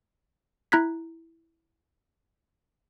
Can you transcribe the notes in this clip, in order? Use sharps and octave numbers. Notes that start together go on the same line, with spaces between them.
E4 A#5 F#6 G#6 B6